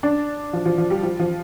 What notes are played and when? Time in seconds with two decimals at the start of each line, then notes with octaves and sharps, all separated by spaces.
0.03 D4
0.53 F3
0.65 F3
0.78 F3
0.90 G3
1.03 F3
1.19 F3